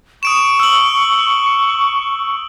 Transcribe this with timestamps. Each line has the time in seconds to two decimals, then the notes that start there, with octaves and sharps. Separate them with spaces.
0.23 C#6 D#6 D7 E7
0.60 E6 F#7